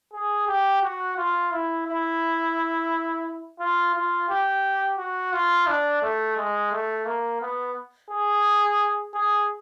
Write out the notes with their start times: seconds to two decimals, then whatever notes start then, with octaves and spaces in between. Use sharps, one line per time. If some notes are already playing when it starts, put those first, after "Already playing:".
0.13 G#4
0.48 G4
0.83 F#4
1.18 F4
1.52 E4
1.87 E4
3.60 F4
3.95 F4
4.29 G4
4.98 F#4
5.33 F4
5.67 D4
6.02 A3
6.37 G#3
6.72 A3
7.06 A#3
7.41 B3
8.10 G#4
9.14 G#4